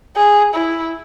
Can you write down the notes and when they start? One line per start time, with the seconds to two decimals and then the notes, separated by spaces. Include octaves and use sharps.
0.17 G#4
0.55 E4